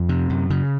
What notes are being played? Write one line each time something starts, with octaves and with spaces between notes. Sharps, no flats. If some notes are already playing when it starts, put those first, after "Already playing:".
Already playing: F2
C3
F#2
C#3